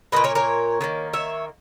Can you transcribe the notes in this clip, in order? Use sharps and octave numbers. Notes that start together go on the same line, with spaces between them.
A#2 F#3 A#3 B4 D#5
A#4 C#5
A#4 C#5
D#3 F#3 A#3
C#5 E5